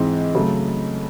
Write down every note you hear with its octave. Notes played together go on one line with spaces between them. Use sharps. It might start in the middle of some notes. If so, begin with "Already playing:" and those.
Already playing: G#2 E3 G#3 C4
C#3 F#3 A3